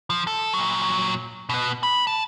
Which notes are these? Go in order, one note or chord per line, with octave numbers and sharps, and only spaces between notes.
F3
A4
A#2 F#3
B2 B3
B5
A5